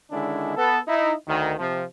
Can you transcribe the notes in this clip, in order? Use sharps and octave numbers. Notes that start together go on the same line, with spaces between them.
D3 D#3 G#3 C#4 D4 E4
B3 A4
D#4 E4
D2 D#3
C3 F3